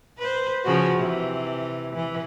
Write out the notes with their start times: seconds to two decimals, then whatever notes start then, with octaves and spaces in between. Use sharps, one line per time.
0.18 B4 C5
0.64 C#3 F3 F#4
0.98 C3 E3
1.95 E3